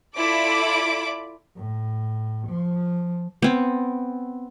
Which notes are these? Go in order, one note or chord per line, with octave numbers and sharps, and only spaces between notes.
E4 F4 A4 D5 B5 D6
A2
F3
B3 C4